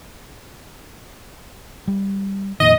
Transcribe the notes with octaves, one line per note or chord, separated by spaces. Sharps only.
G3
F2 A#2 D#3 D#5